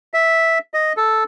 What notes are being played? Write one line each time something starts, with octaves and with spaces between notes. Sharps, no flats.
E5
D#5
A4